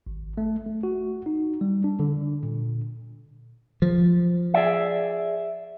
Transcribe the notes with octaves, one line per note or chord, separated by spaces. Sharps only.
G#1
A3
A3
F#4
D#4
G3
D4
D3
A#2
F3
G#4 D5 E5